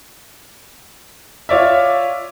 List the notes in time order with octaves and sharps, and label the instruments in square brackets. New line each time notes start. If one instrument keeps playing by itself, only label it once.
[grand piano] F4 C#5 D5 E5